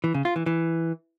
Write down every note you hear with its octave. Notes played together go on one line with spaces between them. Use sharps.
E3
C#3
F4
E3
E3